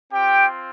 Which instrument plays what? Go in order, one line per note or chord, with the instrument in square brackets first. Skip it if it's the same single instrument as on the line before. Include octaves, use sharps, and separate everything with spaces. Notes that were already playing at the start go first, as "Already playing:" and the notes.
[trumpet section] C4 F4 G4 G5